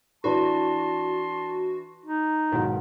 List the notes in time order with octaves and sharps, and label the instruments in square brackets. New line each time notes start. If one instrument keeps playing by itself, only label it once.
[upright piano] E3 D4 B4 [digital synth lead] F#4 [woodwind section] A5 C6
[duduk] D#4
[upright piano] B1 G#2 [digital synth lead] D#3